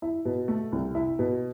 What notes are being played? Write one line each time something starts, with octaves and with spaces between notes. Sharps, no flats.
E4
B2
A3
C2
E4
B2